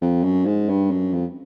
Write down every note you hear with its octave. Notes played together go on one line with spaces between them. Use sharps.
F2
F#2
G#2
G2
F#2
F2